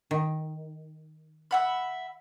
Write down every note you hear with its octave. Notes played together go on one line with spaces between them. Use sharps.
D#3
E5 F#5 B5